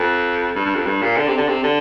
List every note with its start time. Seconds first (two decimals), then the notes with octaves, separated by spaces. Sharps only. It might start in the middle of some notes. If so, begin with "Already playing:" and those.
Already playing: F2
0.55 G2
0.65 G2
0.76 F2
0.87 G2
1.02 A#2
1.17 D3
1.28 C3
1.37 D3
1.48 C3
1.64 D3